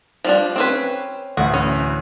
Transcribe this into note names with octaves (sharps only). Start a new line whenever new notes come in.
F3 G3 D4
C4 C#4 B4
D2 A2 E3 F#4
C#4